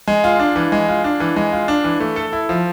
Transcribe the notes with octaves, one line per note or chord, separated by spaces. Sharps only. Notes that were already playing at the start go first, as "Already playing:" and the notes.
G#3
F4
D4
E3
G#3
F4
D4
E3
G#3
F4
D4
E3
A3
A4
E4
F3